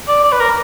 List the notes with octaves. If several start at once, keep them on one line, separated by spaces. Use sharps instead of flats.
D5
D5
B4
A#4